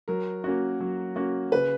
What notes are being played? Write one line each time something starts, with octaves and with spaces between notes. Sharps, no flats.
F#3 A#4
A#3 C#4 F#4
F#3
A#3 C#4 F#4
C#3 B4